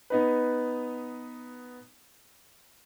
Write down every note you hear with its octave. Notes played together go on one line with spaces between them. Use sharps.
B3 D#4 B4